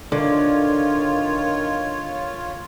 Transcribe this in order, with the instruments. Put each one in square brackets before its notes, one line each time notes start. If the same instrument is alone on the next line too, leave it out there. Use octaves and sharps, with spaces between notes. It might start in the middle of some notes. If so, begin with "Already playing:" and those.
[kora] D3 [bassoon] D#3 [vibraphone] D4 [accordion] F4 C#5